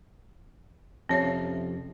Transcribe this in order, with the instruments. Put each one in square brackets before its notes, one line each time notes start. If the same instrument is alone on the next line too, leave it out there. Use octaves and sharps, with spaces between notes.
[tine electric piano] F2 C3 F3 [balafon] C#4 C#5 E5